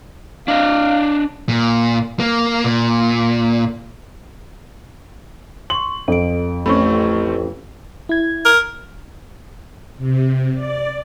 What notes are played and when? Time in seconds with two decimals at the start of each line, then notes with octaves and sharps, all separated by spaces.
0.48 D4 D#5 F5
1.49 A#2
2.20 A#3
2.64 A#2
5.70 C6 C#6 F#7
6.08 F2 A4 D7
6.66 A1 A3 C4 C#4 B5 C#6
8.09 E4 G#6
8.45 A#4
9.98 C3
10.54 D5